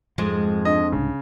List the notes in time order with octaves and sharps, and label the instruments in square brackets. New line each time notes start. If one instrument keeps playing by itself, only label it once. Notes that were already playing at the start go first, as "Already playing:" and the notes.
[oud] F2 G#3 [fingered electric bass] G#2 F3
[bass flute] D4 [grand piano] D#5
[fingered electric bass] C2 G#2 [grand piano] C#3